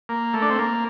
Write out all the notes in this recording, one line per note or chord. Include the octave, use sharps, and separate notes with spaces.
A#3
A3
D4
C4
A#3